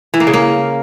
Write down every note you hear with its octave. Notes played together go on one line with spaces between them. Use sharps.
E3
A#3
C#3
A#3